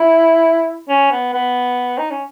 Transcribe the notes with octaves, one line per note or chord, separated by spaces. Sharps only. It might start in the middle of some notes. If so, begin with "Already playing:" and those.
Already playing: E4
C#4
B3
B3
D#4
C#4